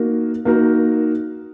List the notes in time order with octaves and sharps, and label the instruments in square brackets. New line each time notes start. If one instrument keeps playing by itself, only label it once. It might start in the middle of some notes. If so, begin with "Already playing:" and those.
Already playing: [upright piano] A#3 D#4 F#4 A#4
A#3 D#4 F#4 A#4